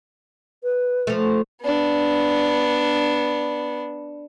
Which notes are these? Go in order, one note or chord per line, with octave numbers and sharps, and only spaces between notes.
B4
F3 A3
B3 D4